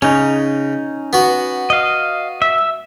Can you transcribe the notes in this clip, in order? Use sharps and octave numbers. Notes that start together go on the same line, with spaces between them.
C#3 C#4 D#4
B3 F#4
D#5 F5
E5